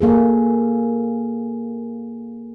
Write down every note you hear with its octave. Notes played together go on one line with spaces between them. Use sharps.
A#3 G#4 A4